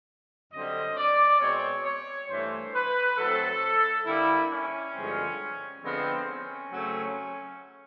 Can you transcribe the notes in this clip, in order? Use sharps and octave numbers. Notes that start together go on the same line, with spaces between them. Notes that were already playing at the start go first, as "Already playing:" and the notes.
F#2 D3 G3 C4 D#5
D5
B2 G#3 C4 C#5
C#5
G2 E3 A3 C5
B4
A2 F#3 A3 C4 A4
D3 G3 A#3 E4
C#4
G2 D3 F3 G#3 C4
D3 F3 G#3 B3 C4
C#4
C#3 F#3 A3 C4